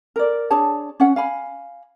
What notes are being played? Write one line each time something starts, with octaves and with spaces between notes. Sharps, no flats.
A#4 D5
D4 G#4 C#5 A5
C#4 F#5
F5 G#5 B5